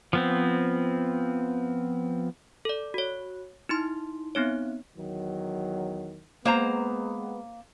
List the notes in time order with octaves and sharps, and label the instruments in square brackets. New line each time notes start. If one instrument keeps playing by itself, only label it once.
[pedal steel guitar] F3 B3 C4
[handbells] A4 D5
F#4 C#5
D#4 E4 C6
B3 C4 D#4 C#5
[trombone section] E2 D#3 F#3
[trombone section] G#3 B3 [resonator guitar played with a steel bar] A#3 C5 A#5